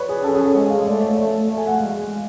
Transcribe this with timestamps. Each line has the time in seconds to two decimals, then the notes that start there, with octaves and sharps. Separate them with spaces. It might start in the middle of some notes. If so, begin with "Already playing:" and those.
Already playing: B4 C#5 D5
0.09 G#4
0.24 C#4 A4
0.34 G#4
0.45 A4
0.55 G#3 C#5
0.70 F5
0.86 A3 D5
1.02 C#5
1.17 A3 D5
1.47 A3
1.57 G#5
1.67 F#5
1.78 G#3 F5